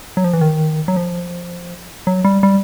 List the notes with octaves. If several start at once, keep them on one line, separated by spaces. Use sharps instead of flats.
F#3
F3
E3
D#3
F#3
F3
F#3
G3
G3